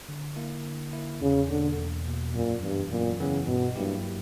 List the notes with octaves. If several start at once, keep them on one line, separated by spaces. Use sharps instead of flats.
D3
A#3 E4
D3
A#3 E4
E2 C#3
B2 D3 A#3
E2
B2 A#3
F#2 A#2
G2 E3 B3
F#2 A#2
C#3 E3 B3
G2 B2
G2 F#3 A#3 E4 G4